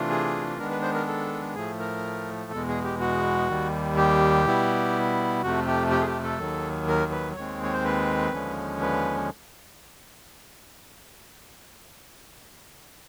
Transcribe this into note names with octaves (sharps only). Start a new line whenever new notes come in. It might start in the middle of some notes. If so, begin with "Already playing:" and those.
Already playing: C3 E3 A3 D4 F4
G#4
D#3 G#3 B3 D4 A#4
B4
C5
A#4
A4
A2 F3 A3 G#4
A#4
E2 B2 G#3 A4
G#4
G4
F#4
D#2 D#3 G3
G4
B2 G3 B3 E4
F2 C3 F3 A3 F#4
G4
G4
G#4
G4
A4
D#2 D#3 F#3
A#4
B4
D#2 D#3 G#3 C4 C#5
C#5
C5
B4
D#2 D3 F3 G#3 C#4
B4